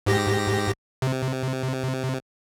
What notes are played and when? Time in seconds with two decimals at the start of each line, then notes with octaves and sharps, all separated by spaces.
0.06 G#2 G4 A#6
1.02 C3